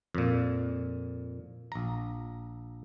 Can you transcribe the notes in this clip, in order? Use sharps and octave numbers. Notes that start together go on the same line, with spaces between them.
F2 A#2
A#1 A#5